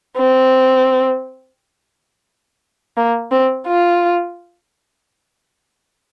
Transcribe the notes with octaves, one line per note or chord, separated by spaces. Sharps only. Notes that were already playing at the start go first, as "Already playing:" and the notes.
C4
A#3
C4
F4